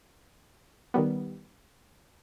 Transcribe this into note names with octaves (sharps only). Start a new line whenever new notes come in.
D#3 G3 B3